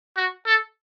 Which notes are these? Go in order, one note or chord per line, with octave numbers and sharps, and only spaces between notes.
F#4
A4